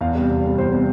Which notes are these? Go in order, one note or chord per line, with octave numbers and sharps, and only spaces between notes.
E2 F5
C3 G3
E2
C3 G3
E2 C5
C3 G3